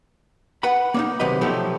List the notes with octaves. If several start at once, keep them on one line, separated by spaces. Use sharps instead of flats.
B4 F#5 B5
A#3 D4 D#4
C3 D#3 F#3 B4 D#5 B5
B2 F3 F#3 A3 G4 A4